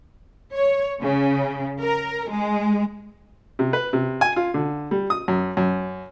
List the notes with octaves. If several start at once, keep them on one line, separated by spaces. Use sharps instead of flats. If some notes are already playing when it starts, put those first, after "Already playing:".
C#5
C#3
A#4
G#3
C3
B4
C3
G#5
F4
D3
G3
D#6
F#2
F#2